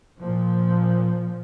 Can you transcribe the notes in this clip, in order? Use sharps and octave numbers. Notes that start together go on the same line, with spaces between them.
A#2 F3